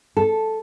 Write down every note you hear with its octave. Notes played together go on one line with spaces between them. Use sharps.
A4